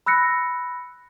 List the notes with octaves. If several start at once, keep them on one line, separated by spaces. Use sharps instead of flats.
B5 E6 F#6 A#6 C#7